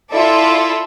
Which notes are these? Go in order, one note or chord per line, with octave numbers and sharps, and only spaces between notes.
E4 F4 A4 D5 E5